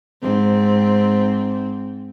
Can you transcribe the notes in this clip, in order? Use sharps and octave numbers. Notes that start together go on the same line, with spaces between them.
G#2 C4